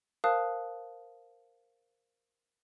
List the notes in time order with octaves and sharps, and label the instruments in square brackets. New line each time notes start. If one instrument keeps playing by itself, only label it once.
[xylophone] A#4 C5 F5 A5 D#6 F#6